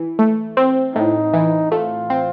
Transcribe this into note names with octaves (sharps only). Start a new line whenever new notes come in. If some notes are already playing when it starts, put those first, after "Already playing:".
Already playing: E3
A3
C4
A2 D#4
E3
A3 F4
C4